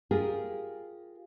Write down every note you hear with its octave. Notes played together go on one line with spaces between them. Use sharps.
F4 G4 G#4 A#4